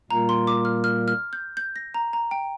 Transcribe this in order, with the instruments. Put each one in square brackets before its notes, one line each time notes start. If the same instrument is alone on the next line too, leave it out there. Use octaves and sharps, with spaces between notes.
[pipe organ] A#2 G3 A#3 F4 A#4 [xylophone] A#5
[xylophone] C6
D6
F6
F6
F6
G6
G6
A#6
A#5
A#5
G5